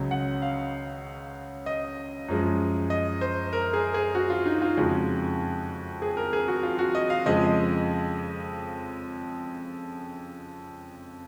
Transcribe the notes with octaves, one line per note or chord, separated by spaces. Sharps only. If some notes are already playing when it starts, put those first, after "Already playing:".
Already playing: C#2 C#3 F#3
F#5
F5
D#5
F#2 F3 G#3
D#5
C5
A#4
G#4
G#4
F#4
F4
D#4
F4
F2 C#3 G#3 F#4
G#4
A#4
G#4
F#4
F4
F#4
D#5
F5
F2 C#3 F3 G#3 D#5
D#5